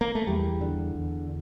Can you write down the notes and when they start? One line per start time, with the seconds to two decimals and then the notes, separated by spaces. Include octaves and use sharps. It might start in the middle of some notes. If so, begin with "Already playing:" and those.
0.01 A#3
0.15 A3
0.27 E2 G3
0.61 D3
0.95 E2